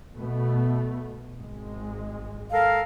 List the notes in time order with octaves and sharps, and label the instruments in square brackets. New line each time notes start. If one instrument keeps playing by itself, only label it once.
[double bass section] B2 A3 B3
G#1 G#3
[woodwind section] A4 A#4 F5